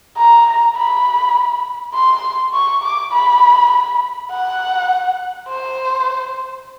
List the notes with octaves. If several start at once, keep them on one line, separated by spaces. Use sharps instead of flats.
A#5
B5
C6
C#6
D6
B5
F#5
C5